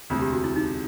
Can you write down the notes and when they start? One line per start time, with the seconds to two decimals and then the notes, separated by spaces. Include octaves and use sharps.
0.10 E1 D2 C3 F4
0.21 G4
0.33 F#4
0.44 E4
0.56 D#4